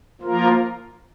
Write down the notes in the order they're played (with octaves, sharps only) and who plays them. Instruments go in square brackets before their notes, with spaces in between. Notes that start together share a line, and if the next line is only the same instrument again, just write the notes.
[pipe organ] F3 A#3 F4 A#4